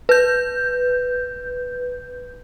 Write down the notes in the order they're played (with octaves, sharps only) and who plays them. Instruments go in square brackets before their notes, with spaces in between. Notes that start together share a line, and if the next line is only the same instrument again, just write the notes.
[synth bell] B4 G6